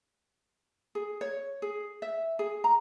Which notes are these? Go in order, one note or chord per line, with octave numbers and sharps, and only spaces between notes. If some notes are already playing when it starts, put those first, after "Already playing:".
G#4
C#5
G#4
E5
G#4
A#5